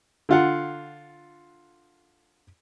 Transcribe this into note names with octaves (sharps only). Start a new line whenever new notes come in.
D3 F4 F#5